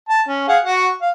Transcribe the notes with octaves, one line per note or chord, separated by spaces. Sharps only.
A5
C#4
G#4 F5 F#5
F#4 F#5
F5